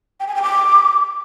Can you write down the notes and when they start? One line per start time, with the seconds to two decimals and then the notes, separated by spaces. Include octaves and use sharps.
0.20 G5
0.28 G#5
0.35 G5
0.43 D6